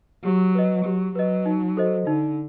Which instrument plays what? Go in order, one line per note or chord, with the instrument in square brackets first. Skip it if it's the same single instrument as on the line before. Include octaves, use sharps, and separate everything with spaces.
[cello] F#3 [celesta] G4
[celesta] B4 D#5
[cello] F#3 [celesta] G4
[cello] F#3 [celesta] B4 D#5
[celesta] D#4
F#4 A4 C5 D#5
[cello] D3 [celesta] D#4